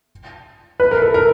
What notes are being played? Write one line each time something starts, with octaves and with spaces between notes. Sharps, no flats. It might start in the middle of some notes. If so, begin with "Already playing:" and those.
B4
A#4
A4
A#4